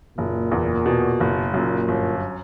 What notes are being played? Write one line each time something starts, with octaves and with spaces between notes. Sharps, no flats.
F#1 A#2
E2
B2
F#1
F#2 A#2
G1